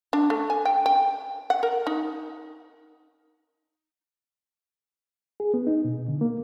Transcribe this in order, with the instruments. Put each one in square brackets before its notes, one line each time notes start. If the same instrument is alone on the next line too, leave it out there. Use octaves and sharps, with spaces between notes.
[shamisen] D4
A3
G#5
G5
G5
F#5
A#4
D#4
[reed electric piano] G#4
B3
D#4
B2
D3
A#3